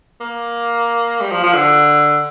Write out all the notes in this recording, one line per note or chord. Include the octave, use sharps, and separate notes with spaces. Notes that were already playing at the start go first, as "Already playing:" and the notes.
A#3
G3
F3
F3
D3